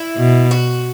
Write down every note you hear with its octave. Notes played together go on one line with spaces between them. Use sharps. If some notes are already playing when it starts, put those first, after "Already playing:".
Already playing: E4
B2
F#4